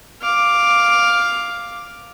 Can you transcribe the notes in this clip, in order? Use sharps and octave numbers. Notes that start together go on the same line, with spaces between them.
F5 D6